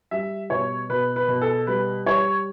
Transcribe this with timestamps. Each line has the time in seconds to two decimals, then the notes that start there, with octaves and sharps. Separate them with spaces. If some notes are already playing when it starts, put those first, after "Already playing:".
0.11 G3 E5
0.50 B2 C#5
0.89 B2 B4
1.16 B4
1.28 B2
1.41 A4
1.67 G3 B4
2.06 G3 C#5